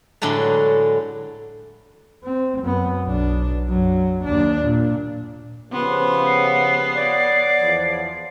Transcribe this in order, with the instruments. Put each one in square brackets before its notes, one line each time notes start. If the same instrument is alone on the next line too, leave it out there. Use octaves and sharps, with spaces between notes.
[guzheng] A2 D3 F#3 G#3 A3
[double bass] C4
F#2 B3
B1 D4
F#2 F#3
D#2 D4
A#2
[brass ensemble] C#3 F3 G4 [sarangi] B3 [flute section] C6
[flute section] F#5 [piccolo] C7
[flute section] C#5 D5 F#5
[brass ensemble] E2 F3